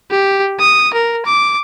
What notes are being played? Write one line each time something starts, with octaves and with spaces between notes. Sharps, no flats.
G4
D#6
A#4
D6